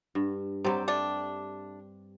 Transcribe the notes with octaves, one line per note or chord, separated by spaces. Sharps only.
G2
C3 F#3 G3 C4 G4
A3 D4